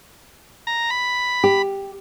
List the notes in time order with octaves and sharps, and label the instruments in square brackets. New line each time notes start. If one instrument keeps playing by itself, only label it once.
[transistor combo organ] A#5
B5
[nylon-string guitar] G4